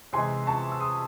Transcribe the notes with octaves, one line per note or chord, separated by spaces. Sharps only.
C3 E3 G#3 G#5 C6
A5 C#6
E6
C6 D#6